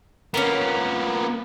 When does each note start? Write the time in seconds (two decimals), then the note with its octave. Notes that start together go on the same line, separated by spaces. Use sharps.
0.34 A#3 B3 C#4 F4 A#4